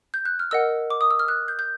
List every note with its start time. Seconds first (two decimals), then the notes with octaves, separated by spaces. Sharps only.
0.14 G6
0.25 F#6
0.39 F6
0.51 A#4 D#5 F#5 E6
0.90 D6
1.01 D#6
1.11 E6
1.19 F6
1.28 F#6
1.48 G6
1.59 G6